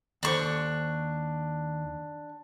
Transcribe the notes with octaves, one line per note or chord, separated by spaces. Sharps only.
D#2 D4 A4 C5 C#6